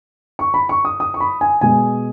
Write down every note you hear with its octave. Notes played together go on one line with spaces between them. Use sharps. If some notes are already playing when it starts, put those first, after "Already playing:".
C#6
B5
C#6
D#6
D#6
C#6
B5
G#5
B2 G#3 B3 G#5